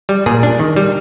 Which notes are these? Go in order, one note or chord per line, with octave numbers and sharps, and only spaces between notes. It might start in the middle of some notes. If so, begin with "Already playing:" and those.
G3
A#2 G#4
D4
D#3
G3